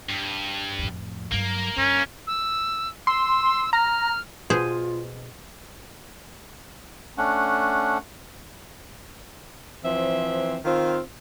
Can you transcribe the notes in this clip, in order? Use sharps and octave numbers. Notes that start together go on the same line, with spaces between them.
G2
F2 A2
G2 F#3 A#3
G2 C#4
E6
C6 E6
A#5 F6
B2 F4 G#4 C5
A3 C#4 D4 F#5
E3 F3 C4 E5
D#3 C4 F4